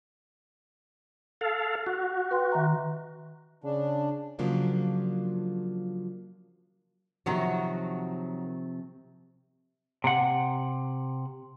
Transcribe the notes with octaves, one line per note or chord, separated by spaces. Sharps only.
A4 F5
F#4
B4 G5 C6
D#3 E5 A#5
C#3 D4
C#3 F3 F#3 A#3 D4 F4
C3 D#3 F3 F#3 F#4
C3 F#5